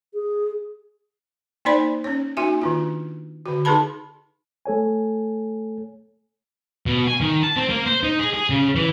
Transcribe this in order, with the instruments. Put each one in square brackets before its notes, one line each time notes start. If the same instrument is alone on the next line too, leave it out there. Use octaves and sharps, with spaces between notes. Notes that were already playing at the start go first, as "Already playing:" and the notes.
[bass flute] G#4
[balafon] A#3 D#4 C5 D5 B5 C6
C#4 C#5
A#3 D#4 F#4 E5 G#5
D#3 D4 F4
D3 F#4
D#4 G#4 A4 B4 A5 B5
[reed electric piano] A3 A4 C#5 G#5
[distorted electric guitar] B2
G#5
D#3
A5
C4
A#3
C5
D#4
G#4
G#4
C#3
E3